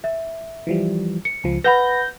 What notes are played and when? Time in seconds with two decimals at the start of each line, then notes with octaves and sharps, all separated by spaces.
0.04 E5
0.67 E3 F3 G3
1.25 C#7
1.44 C#2 F3
1.64 B4 F#5 B5 G6 A#6